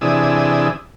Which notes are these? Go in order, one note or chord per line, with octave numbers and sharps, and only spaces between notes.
C3 E3 D4 G#4 D#6 E6